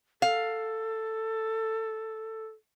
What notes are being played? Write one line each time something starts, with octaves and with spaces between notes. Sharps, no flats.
A4 F5